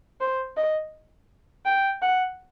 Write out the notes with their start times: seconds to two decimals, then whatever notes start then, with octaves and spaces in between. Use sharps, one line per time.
0.21 C5
0.57 D#5
1.65 G5
2.02 F#5